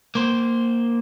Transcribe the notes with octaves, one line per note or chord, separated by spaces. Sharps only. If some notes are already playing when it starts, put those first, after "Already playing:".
A#3 C5